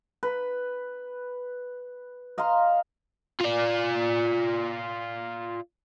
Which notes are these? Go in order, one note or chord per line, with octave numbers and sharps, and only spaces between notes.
B4
D#5 F5 A#5 C6
F4 D5